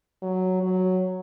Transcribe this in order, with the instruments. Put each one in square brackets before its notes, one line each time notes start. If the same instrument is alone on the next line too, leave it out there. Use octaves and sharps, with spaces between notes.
[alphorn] F#3
F#3